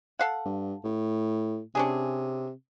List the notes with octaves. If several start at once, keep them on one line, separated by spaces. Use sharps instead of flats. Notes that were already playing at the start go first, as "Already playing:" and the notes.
A4 F5 F#5
G2
A2
C3 C#4 D4 G#4